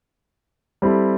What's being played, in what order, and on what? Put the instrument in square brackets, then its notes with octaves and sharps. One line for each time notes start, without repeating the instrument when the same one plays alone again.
[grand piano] G3 C4 E4 A4